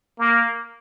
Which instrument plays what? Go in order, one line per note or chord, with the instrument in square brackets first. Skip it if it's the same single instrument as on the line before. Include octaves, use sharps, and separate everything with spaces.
[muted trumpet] A#3